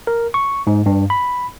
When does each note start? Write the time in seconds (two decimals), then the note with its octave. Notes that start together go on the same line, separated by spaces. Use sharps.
0.07 A#4
0.34 C#6
0.67 G#2
0.86 G2
1.10 B5